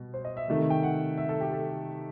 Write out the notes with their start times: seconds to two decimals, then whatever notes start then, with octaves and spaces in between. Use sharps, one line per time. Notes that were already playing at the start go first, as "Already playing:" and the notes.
Already playing: B2 G3
0.14 C5
0.25 D#5
0.37 E5
0.48 C3 D#3 A3
0.70 G5
0.83 F#5
1.18 E5
1.29 A4
1.41 G4
1.53 A4